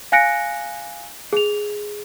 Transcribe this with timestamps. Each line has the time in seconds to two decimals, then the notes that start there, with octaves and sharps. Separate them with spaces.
0.12 F5 G#5 F#6 A#6 C#7 D7
1.33 G#4 F7